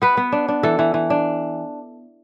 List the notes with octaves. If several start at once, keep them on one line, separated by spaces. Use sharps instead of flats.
B3 B4
B3
D4
D4
E3 A4
E3
E3
D4